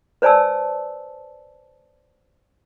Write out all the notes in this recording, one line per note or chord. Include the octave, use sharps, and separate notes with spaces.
B4 C5 D5 G#5 A5 E6